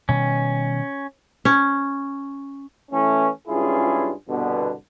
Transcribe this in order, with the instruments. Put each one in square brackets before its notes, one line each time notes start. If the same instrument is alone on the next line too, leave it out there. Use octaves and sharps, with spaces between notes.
[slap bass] B2 D#3 G3 [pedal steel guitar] C#4
[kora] C#4
[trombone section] E3 A3 C#4
C#2 G2 C#4 E4 F4 G#4
C2 G2 B2 D3 B3